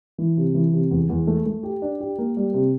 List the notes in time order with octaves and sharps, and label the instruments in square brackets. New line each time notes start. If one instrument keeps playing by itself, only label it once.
[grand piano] E3
C3
E3
C3
E2
E2
A3
A3
G4
D4
G4
A#3
G3
C3